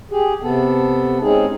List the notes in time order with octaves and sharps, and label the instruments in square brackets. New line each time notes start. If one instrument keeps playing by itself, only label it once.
[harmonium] G4 G#4
C3 B3 A4
G#3 C4 C#4 D#4 G#4